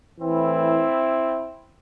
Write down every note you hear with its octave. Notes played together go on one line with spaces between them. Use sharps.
A2 E3 C4 E4